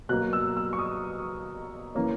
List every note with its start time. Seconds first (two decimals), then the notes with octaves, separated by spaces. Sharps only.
0.09 B2 F#3 A#3 F#6
0.33 E6
0.57 E6
0.73 C#6
0.79 D#6
1.95 E3 A#3 C#4